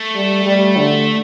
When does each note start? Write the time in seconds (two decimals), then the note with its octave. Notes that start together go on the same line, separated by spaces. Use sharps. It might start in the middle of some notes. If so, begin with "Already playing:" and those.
Already playing: A3
0.15 G3
0.45 G3
0.77 D3